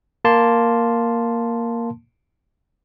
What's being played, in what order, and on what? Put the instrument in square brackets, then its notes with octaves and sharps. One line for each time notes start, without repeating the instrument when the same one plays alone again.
[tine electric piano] A#3 A5 C6